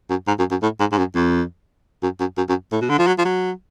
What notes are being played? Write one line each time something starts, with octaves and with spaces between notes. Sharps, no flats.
F#2
G#2
F#2
F#2
A2
G#2
G#2
F#2
F2
F#2
F#2
F#2
F#2
A2
B2
D3
F3
F#3
F3
F#3